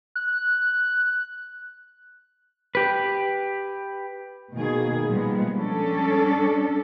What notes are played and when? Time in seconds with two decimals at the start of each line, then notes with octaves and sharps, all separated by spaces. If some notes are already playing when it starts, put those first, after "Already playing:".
0.15 F#6
2.75 G4 B4
4.53 B2 D#3 A#3 G#4
5.07 A#2 F3 G3 G#3 B3
5.59 G3 C#4 D4 A4